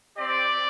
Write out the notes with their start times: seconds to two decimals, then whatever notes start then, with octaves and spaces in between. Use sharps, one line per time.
0.16 C4 G4 D5